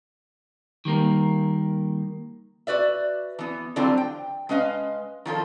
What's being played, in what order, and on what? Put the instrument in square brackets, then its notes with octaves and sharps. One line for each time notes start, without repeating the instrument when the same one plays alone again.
[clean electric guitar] D#3 G3 A#3 A#4
[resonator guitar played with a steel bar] F#4 B4 D5 E5
E3 B3
D3 E3 F#3 G3 C4 F4
G5
G#3 C#4 B4 D#5 F5
D#3 F3 F4 A4